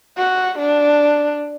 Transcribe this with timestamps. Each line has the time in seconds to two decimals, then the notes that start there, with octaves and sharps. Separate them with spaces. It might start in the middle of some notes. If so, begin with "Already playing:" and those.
0.18 F#4
0.58 D4